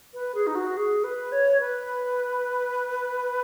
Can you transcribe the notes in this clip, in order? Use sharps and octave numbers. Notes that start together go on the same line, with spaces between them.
B4
G#4
D#4
F#4
G#4
B4
C#5
B4